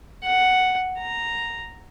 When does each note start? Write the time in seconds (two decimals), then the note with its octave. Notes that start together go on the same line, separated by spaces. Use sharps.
0.24 F#5
0.98 A#5